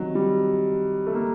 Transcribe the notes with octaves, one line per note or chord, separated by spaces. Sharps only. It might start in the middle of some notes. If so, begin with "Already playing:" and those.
Already playing: C3 D#3 F#3
G3
A3
A#3